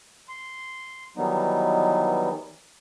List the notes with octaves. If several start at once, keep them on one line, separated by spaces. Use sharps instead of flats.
C6
D#3 E3 F#3 G3 B3 D#4